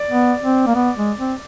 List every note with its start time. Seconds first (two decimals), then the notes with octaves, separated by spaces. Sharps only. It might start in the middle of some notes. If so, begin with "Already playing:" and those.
Already playing: D5
0.10 B3
0.42 C4
0.67 A#3
0.75 B3
0.97 G#3
1.19 C4